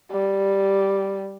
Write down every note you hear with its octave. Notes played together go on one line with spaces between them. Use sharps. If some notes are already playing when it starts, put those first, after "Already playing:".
G3